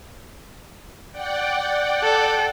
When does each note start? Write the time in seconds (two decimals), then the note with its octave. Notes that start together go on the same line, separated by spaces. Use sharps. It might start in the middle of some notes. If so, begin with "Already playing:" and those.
1.12 D5 F#5 G5
2.03 A4